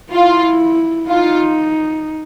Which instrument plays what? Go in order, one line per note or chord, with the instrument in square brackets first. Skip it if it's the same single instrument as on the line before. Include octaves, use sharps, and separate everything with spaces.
[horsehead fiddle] E4 [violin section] F4
[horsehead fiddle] D#4 [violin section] F4